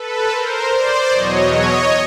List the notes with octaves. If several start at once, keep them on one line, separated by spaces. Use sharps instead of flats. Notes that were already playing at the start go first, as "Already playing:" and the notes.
Already playing: A4 B4
A#4 C5
C5 D5
E2 B2 F#3 C#5 D#5
C#5 D#5